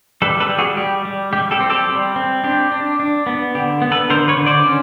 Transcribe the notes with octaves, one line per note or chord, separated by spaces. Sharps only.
G3 A4 B4
A4 B4
G3
F#4 G#4
G3 G4
G3
G3 G4
G4 A4
C4
G4 A4
G3
C4
D4 G4
D4
D4
B3
D3 G4
B3
A4 B4
D3 A#4 C5
B4 C#5
D3
C5 D5
C#4